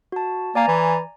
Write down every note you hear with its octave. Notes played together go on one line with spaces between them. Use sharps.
F#4 A5
A#3 D5 G#5 A#5
E3